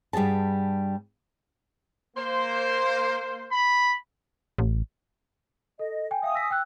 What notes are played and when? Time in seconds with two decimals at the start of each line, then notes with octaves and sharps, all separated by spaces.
0.13 G2 G3 B3 G#4 A5
2.17 A#3 C5
3.52 B5
4.58 A1
5.79 A4 D#5
6.11 G5 G#5
6.23 E5 F5 G5 G#5 D#6
6.35 E6 A#6 B6
6.51 G5 E6 F#6